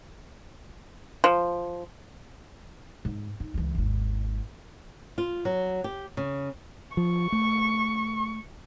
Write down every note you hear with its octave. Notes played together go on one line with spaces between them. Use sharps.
F3
G#2
D#4
C#2 E3
G#1 D#2
F4
F#3
G4
C#3
F3 C#6
A3